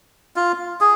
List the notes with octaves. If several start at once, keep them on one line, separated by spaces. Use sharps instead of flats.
F4
G#4